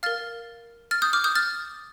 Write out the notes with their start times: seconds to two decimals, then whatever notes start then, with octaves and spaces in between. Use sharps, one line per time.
0.03 A#4 F5 F6 A6
0.91 F6 A6
1.02 D#6 G6
1.13 D6 F6
1.24 D#6 G6
1.35 F6 A6